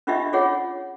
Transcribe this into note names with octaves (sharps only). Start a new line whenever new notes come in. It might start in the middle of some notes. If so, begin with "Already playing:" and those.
C#4 D4 F4 G4 D#5 E5
F4 G#4 C#5 F#5